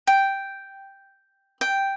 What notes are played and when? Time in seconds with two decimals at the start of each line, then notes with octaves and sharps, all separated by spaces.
0.07 G5
1.61 G5